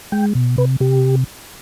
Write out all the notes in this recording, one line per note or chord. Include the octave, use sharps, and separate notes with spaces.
G#3 G5
B2
C3 B4
C3 G4